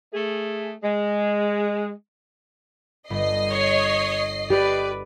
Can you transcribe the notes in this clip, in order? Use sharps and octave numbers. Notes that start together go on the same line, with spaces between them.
A3 G#4
G#3
G1 D#5 B5 C7
C#5
G4 B4 D5